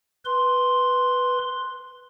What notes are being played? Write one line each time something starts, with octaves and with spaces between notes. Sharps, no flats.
B4 C6